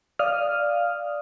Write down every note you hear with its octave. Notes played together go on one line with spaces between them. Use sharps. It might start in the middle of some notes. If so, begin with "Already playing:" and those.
D5 F5 D#6 F6